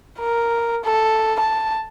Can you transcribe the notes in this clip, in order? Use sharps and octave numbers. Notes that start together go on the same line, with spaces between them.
A#4
A4
A5